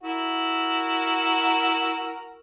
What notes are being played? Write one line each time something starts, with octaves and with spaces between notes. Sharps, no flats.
E4 F#4 A#4